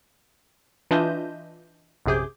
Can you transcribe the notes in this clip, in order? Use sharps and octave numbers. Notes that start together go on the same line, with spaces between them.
E3 D4 F4 D#5 E5 G6
A#1 F#2 C3 G#4 D6 G6